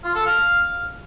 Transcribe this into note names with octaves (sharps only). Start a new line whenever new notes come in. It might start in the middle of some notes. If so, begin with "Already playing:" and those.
F4
A4
F5